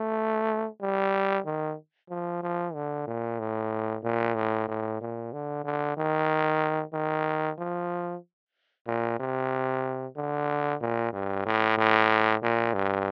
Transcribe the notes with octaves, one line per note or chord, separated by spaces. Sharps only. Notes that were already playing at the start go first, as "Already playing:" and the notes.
Already playing: A3
G3
D#3
F3
F3
D3
A#2
A2
A#2
A2
A2
A#2
D3
D3
D#3
D#3
F3
A#2
C3
D3
A#2
G2
A2
A2
A#2
G2